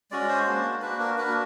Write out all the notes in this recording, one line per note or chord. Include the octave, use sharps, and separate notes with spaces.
G#3 C#4 F#4 D5
C5
A#3 D4 F#4
A#3 D4 F#4 B4
A#4
A#3 D4 F#4 B4